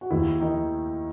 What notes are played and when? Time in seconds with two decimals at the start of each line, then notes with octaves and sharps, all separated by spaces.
0.01 F#4
0.11 D#2 E4
0.40 D#3 D#4